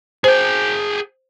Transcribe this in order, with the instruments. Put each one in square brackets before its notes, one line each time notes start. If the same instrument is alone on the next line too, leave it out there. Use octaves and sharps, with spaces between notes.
[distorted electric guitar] G#4 G5 [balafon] C5